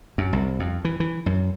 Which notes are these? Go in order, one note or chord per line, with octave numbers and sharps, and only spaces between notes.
F#2
C2
F2
E3
E3
F#2